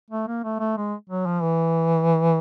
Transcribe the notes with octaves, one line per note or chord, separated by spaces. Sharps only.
A3
A#3
A3
A3
G#3
F#3
F3
E3